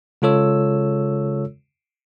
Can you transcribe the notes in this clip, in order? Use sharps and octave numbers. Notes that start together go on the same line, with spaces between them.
C#3 G#3 F4 A4 C#5 E6